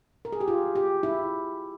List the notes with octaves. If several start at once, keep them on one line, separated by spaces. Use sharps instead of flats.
A#4
G#4
G4
F4
G4
E4